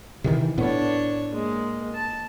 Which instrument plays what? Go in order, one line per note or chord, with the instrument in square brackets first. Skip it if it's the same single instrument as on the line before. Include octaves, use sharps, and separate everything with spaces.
[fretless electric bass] C3 D#3 E3
[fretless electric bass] A2 B3 [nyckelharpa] D4 C#5
[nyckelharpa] G#3 A#3
A5